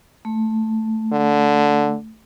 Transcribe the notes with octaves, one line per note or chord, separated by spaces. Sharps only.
A3
D3